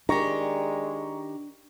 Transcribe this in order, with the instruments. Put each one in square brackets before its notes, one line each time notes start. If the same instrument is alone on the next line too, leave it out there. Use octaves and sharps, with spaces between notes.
[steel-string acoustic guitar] D#3 G4 [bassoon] G#3 [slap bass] D4 [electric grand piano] A#5 C#6 A#6